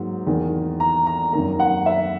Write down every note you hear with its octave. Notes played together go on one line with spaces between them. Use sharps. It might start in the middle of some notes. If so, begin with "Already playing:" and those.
Already playing: G#2 F#3 A#3
E2 D#3 A#3
A#5
A#5
F#2 D#3 A#3 A#5
F#5
E5